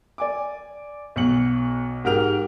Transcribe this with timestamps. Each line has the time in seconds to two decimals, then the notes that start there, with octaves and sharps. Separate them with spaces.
0.18 D5 G#5 D6
1.16 B1 B2 C#7 F#7
2.04 G#2 F#4 G4 A#4 F6 F7